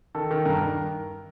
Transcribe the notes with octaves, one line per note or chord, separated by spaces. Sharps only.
D#3 A4
D#3
G2 A#4
D#3